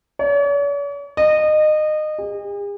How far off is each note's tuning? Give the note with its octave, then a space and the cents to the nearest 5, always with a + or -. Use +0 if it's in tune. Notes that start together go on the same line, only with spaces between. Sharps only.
C#5 +45
D#5 -25
G#4 -45